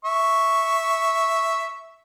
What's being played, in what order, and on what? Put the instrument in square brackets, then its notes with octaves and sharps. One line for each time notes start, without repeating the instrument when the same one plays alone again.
[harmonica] E5 C#6